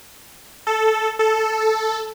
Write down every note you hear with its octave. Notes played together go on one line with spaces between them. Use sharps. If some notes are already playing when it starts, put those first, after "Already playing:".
A4
A4